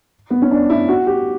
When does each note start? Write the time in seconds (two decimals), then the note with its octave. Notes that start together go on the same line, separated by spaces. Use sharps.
0.30 B3
0.42 C#4
0.51 D4
0.70 E4
0.89 F#4
1.07 G4